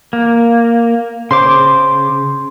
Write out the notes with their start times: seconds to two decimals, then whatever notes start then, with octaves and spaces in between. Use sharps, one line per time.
0.13 A#3
1.31 C#3 C5 C6 D6